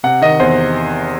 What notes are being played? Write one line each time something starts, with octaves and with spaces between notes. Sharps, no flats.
C3 F#5
D#3 D#5
E2 C5